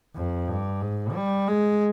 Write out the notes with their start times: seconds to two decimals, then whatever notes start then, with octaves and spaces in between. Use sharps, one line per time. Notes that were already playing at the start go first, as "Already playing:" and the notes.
0.15 F2
0.48 G2
0.81 G#2
1.15 G3
1.48 G#3